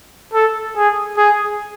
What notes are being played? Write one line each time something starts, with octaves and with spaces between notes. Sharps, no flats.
A4
G#4
G#4